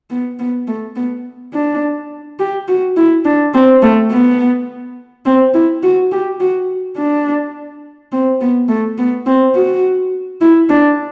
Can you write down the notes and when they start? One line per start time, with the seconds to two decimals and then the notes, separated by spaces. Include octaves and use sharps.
0.10 B3
0.39 B3
0.67 A3
0.96 B3
1.54 D4
2.39 G4
2.68 F#4
2.97 E4
3.25 D4
3.54 C4
3.82 A3
4.11 B3
5.26 C4
5.54 E4
5.83 F#4
6.12 G4
6.40 F#4
6.98 D4
8.12 C4
8.41 B3
8.69 A3
8.98 B3
9.26 C4
9.55 F#4
10.41 E4
10.70 D4